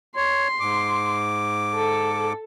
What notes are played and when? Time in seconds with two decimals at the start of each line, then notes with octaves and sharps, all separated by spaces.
0.16 C#5 C6
0.60 G#2 D6
1.75 A4